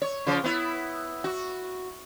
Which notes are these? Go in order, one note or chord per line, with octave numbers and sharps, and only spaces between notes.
C#5
C#3 F3 F4
B3 E4
F#4